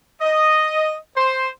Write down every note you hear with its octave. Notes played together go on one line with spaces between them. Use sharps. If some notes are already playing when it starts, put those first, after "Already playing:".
D#5
C5